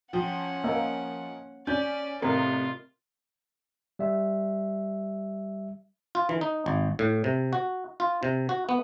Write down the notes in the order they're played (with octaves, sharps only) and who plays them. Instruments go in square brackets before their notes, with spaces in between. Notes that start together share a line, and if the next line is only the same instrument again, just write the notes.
[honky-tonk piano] F3 [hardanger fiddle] C#4 F#5 [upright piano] G5
[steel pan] A#3 [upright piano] A#4 D#5
[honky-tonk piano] C#4 [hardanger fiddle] D5 [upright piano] G6
[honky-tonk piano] A1 [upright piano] C3 [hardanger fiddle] F4 [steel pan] A#4
[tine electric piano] G3 E5
[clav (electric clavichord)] F4
E3
D#4
G#1
A2
C3
F#4
F4
C3
F#4
B3